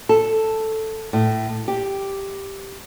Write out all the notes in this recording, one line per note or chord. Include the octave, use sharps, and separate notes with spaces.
A4
A2
G4